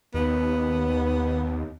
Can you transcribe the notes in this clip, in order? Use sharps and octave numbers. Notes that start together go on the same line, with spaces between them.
D#2 B3